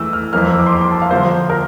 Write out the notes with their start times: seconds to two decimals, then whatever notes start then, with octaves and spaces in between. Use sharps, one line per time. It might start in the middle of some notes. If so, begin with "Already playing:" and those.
Already playing: E3 A3 E6
0.13 F6
0.33 F2 E3 A#3 F6
0.46 E6
0.60 D6
0.66 C6
0.72 D6
0.81 C6
0.91 A5
1.02 F5
1.11 D3 F3 A#3 C5
1.50 A#4